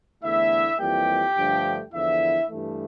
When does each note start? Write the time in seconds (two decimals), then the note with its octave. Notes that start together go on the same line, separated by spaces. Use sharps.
0.22 E2 D3 A3 E4 E5
0.79 F2 E3 G3 A#3 G4 G5
1.36 G2 D3 F3 A3
1.93 E2 D3 F3 E4 E5
2.49 G2 E3 A3